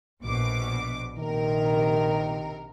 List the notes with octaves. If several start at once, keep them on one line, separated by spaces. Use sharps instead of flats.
A#1 B2 D6
A#1 C3 D#3 A#4